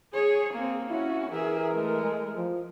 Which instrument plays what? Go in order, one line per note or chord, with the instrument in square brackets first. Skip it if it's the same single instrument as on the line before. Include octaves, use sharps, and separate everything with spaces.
[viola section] G#4 [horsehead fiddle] C#5
[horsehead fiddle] A#3 C4
[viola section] C#4 [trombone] E4 [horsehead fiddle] F#4
[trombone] E3 [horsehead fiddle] G#4 E5 [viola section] A#4
[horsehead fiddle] G#3 A3
[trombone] F3